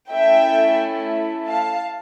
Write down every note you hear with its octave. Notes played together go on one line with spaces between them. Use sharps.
A3 C#4 E4 A4 E5 G5
F5 A5